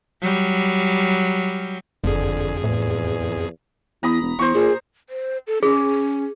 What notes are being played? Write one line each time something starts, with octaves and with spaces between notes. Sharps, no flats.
F#3 G3
F#1 F2 D3 G#4
E2 A2
E2 A#5 B5 D#6
E1
E2 C5 A#5 C#6
A#2 G#4
C5
A4
C#4 G#4